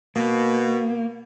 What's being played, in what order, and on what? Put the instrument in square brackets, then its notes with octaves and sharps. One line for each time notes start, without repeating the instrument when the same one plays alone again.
[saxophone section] B2 [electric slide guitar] A#3